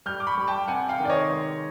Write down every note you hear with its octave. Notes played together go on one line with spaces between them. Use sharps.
G3 F6 G6
D6
B5 C#6
G3
G5 A5
C3 F#5 G#5
F5 G5
D#3
D5
C#5 D#5
G#3